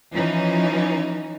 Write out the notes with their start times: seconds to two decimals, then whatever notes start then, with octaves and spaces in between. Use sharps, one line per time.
0.14 E3 F3 C#4 D#4